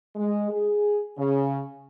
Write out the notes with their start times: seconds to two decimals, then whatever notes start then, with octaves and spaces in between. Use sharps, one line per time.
0.16 G#3
0.51 G#4
1.18 C#3